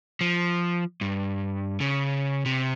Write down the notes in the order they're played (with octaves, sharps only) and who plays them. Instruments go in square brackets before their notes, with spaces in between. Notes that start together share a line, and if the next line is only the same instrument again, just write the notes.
[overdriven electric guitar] F3
G2
C#3
C3